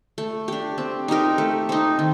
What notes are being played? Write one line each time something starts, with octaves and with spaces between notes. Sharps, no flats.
A3
D4 G4
C4
D#4 G4 A#4
A3
C4 D#4
D#3